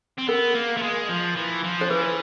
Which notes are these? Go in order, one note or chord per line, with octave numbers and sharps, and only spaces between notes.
C4
B3 A#4
A#3
A3
G#3
F3
E3
F3
C5
E3 B4